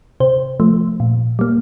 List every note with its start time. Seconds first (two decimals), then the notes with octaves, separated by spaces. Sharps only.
0.20 C3 C5
0.60 F3 A3
1.00 A#2
1.39 G3 A#3